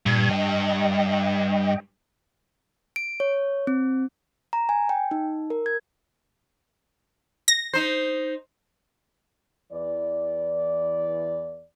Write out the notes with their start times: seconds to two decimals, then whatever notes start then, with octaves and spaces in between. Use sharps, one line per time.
0.06 G2 A#2 G3 G#6
0.31 D#5 G5
2.96 D7
3.20 C#5
3.67 C4
4.53 A#5
4.69 G#5
4.89 G5
5.11 D#4
5.50 A#4
5.66 G#6
7.48 A#6
7.73 D#4 C5
9.72 E2 E3 D5